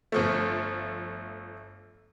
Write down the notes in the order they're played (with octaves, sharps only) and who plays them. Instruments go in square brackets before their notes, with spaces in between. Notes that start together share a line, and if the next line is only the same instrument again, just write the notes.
[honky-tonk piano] G1 F3 A3